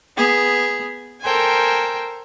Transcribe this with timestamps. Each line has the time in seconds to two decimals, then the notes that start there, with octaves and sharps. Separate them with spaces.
0.17 B3 G#4
1.22 A4 A#4 C5 G5 G#5